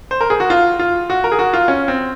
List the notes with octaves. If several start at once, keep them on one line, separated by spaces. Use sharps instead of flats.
C5
A#4
G#4
F#4
F4
F4
F#4
A#4
G#4
F#4
F4
C#4
C4